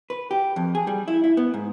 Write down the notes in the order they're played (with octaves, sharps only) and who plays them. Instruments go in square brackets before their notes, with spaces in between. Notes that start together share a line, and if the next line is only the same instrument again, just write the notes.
[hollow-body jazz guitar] B4
G4
F2
G#4
G3
E4
E4
B3
G#2